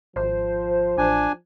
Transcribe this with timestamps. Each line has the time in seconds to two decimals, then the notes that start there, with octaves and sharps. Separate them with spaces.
0.16 G#1 F3 C5
0.98 A1 D4 G#5